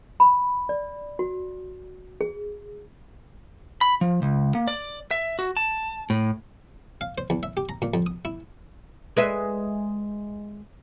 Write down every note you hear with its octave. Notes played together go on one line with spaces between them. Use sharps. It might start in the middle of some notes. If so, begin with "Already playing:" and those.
B5
D5
F#4
G#4
B5
F3
C#2
A#3
D5
E5
F#4
A5
A2
F5
C5
E2
E5
G4
A#5
A#2
F2
D#6
E4
G#3 B4 E5